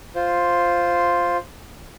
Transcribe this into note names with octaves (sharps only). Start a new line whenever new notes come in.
F4 C5